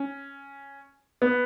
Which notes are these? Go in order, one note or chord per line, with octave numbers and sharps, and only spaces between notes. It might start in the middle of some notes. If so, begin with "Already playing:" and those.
Already playing: C#4
B3